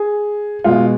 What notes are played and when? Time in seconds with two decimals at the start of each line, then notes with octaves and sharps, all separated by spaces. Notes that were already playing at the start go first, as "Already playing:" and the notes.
Already playing: G#4
0.64 B2 G#3 F4